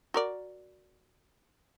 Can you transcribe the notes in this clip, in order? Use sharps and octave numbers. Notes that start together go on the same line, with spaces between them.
F#4 A#4 D5